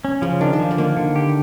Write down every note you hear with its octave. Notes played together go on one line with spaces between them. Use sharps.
C#4
C#3 F3
D#3 D4
D#3
F3
D3
D#3 A#3
D3
G4